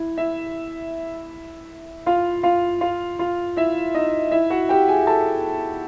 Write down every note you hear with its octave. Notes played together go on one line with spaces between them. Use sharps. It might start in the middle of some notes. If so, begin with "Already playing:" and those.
Already playing: E4
E4 E5
F4 F5
F4 F5
F4 F5
F4 F5
E4 E5
D#4 D#5
E4 E5
F#4 F#5
G4 G5
G#4 G#5
A4 A5